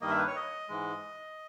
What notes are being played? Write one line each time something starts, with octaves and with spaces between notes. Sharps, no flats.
G2 D#3 G3 A#3 D#5
E5
B4
C#5
D#5
G#2 E3 G#3